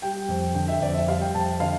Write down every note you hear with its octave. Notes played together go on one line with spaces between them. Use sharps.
G3 G5
F2
D3 G5
E5
F2 D5
E5
G3 F5
G5
F2 A5
D3 F5